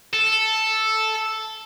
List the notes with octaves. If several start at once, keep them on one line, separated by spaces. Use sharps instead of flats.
A4